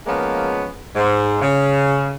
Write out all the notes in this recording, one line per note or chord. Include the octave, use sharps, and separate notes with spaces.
F3 G#3 A#3 B3 C#4
G#2
C#3